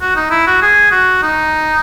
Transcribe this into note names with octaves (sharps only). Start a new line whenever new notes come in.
F#4
D#4
E4
F#4
G#4
F#4
D#4